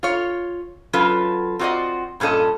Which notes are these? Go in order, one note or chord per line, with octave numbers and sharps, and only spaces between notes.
F4 C#5
F#3 C#4 F4 A4 B4
C4 F4 F#4 G#4 D5 D#5
G2 A#2 C#4 A4 D#5